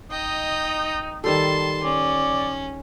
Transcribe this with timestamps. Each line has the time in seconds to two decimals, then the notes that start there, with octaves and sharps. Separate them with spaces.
0.11 D#4 D#5 G5
1.24 D#3 G3 A4 A5 C6
1.83 C#4 D5